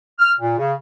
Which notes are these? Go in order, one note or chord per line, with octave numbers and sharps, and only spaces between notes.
F6
A#2
C#3